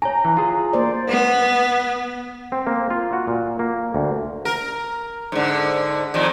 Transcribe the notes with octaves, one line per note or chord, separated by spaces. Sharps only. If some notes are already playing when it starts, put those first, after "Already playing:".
C#5 G#5 A#5
E3
F4 G#4
A#3 C5 D5
B3
C4
A#3
F4
F#4
A#2
A#3
D2
A#4
G#2 D3
F2 A#2 D#3